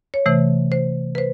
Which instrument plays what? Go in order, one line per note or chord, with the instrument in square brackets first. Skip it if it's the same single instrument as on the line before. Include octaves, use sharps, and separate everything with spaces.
[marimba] C#5
C3 E3 A3 C5
C5
B4
C5